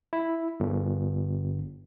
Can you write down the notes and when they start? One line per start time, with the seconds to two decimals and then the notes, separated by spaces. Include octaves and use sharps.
0.13 E4
0.60 G1